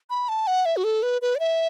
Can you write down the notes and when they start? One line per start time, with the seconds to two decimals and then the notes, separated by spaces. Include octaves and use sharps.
0.10 B5
0.29 A5
0.47 F#5
0.66 E5
0.77 F#4
0.84 A4
1.03 B4
1.22 B4
1.35 D5
1.40 E5